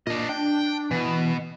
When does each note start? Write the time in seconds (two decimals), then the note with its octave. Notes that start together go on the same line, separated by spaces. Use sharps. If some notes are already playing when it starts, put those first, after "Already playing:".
0.07 A#2 D4 D#5
0.29 D4 G5
0.91 B2 E3